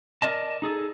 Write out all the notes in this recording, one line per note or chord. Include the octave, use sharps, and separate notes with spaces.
A#4 D5 D#5 A5
D#4 G#4 A4